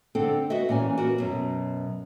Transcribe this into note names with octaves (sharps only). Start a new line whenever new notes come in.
D3 C4 A4 F#5
F#4 B4 D#5 E5
A#2 E3 C#4 G#5
F#4 A#4 B4
F#2 B2